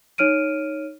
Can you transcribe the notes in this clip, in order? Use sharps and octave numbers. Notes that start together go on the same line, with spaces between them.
D#4 C#5 F6 D7 D#7